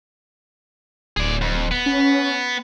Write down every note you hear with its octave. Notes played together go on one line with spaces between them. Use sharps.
D1 G#4 D5
F2
B3
C#4